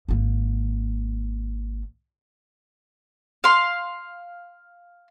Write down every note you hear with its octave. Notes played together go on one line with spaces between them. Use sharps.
G#1 A#3
F5 C6